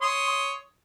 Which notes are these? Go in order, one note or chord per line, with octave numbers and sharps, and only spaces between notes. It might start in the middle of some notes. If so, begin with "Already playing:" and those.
C#5 C6 D#6